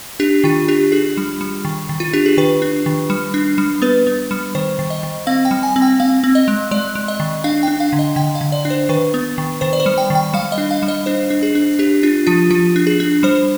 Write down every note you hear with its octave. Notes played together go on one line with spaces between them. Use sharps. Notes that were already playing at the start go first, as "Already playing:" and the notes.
D4 G4
D#3 F4
D4 G4
D4 G#4
G3
G3
D#3
D#3
F4
D4 G4
G#4
D#3 B4
D4
D#3
G3
D4
G3
B3 B4
B3
G3
D#3 C5
D#3
D#5
D#3
C4 F5
G5
G3
G#5
C4
G5
C4 F5
C4
D#5
G#3
G#3 D5
G#3
D#5
D#3
D4 F5
D4 G5
F5
D3
D#5
D3 G5
F5
D3
D5
D4
C5
D#3 B4
B3
D#3
D#3 C5
D5
C5
G3
G5
D#3
G5
G3 F5
D#5
D4
F5
G3
D#5
D4 C5
D4
G#4
D4
D4 G4
D4 F4
F3 F4
F3 F4
D4
G#4
D4
G3 C5